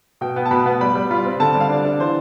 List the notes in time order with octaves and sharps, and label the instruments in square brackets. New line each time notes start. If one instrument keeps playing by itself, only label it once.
[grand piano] B2 G5
B3
A5
B2 B5
B3
G3 B5
G3
F4 B5
C4
D3 A5
G3
F5
D4
D4
E3 C5